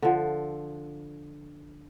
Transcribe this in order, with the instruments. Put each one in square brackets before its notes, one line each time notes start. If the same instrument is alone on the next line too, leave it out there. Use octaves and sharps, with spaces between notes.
[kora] D3 F3